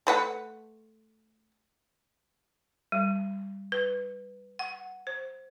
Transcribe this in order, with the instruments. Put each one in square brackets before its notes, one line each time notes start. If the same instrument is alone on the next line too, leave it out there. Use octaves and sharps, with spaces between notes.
[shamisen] A3 B4 F#5
[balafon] G3
B4
F#5
C5